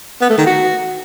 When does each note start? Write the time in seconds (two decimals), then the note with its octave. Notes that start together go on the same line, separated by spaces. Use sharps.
0.22 B3
0.30 A3
0.38 D#3
0.47 F#4